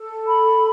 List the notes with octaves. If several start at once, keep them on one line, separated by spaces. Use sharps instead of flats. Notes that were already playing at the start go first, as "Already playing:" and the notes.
Already playing: A4
B5